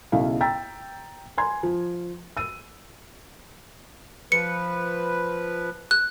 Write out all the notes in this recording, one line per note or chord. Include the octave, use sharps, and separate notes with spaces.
B1 C#3 E4 F5
G5 A#5 E6 A6 B6
G#5 A#5 C6 G#6
F3
E6 D#7
F3 B4 C#7
F#6